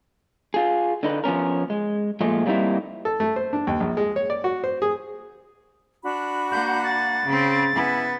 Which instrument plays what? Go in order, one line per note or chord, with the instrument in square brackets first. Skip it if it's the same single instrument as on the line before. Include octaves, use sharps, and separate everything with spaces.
[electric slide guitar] F4 G#4
D3 D#4 B4
F3 B3 C#4 A#4
G#3
A#2 F3 G#3 A3
F#3 G3 A#3 C4 D#4 E4
[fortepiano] A4
A3
C5
D4
D#2
A#1
G#3
C#5
D5
F#4
C5
G#4
[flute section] D4 F#4 B5
[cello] A#3 F#5 [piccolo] G6
[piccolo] A6
[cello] C#3 C4
[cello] B3 [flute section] E4 G#5